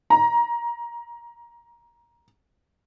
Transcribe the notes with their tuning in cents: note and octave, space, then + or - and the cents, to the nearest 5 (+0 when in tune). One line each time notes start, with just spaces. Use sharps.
A#5 +20